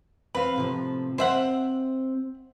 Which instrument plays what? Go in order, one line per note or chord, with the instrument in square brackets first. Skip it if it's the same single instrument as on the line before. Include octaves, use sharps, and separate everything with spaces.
[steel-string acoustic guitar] C4 F5 [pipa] B4
[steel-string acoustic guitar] A2 C3 F3
[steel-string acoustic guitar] C4 [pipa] C5 E5 F#5